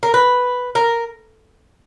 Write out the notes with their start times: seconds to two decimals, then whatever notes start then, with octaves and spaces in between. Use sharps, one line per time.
0.03 A#4
0.14 B4
0.75 A#4